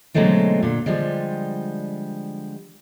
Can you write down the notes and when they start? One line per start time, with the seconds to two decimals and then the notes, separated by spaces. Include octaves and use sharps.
0.14 B2 D3 F#3 G#3 A3 C4
0.63 A#2 D3
0.86 D3 F3 G3 G#3